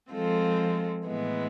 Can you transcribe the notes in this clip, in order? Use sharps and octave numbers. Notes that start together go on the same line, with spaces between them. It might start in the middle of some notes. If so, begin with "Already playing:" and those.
F3 G#3 C4 F4 A4
A2 E3 G#3 B3